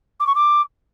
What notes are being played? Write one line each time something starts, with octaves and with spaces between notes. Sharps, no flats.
D6
C#6
D6